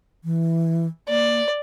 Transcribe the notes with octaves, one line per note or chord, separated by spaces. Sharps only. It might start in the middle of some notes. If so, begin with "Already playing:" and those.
E3
A#3 D5